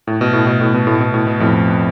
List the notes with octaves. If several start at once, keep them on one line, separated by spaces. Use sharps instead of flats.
A2
B2
A2
B2
A2
B2
A2
B2
A2
B2
F2 A2